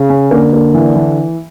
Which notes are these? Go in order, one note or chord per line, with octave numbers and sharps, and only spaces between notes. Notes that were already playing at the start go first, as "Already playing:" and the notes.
Already playing: C#3
C#4
D3 A#3
A#3
E3
E3